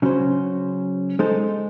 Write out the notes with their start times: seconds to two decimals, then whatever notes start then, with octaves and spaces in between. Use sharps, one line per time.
0.02 C#3 F#3 C#4 F#4 C5
1.19 G#3 D#4 A4 C5